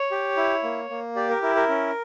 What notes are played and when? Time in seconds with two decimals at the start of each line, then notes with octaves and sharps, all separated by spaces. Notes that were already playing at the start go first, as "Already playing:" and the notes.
Already playing: C#5
0.11 G4
0.37 E4
0.63 A#3
0.90 A#3
1.16 G4 D5
1.29 A#4
1.42 E4 A#4
1.55 A#4
1.69 C#4